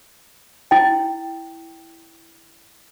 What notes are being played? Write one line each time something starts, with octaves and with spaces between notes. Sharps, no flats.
E4 G5